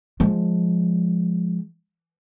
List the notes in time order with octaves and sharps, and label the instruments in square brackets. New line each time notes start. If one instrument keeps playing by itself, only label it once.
[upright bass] F3 G#3